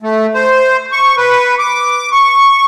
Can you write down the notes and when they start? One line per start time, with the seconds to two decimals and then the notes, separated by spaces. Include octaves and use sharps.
0.02 A3
0.34 C5
0.92 C#6
1.17 B4
1.59 D6
2.12 C#6